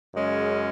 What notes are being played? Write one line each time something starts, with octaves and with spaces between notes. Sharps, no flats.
F#2 C#3 G#3 C#4